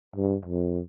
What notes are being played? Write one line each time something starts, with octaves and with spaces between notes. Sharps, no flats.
G2
F2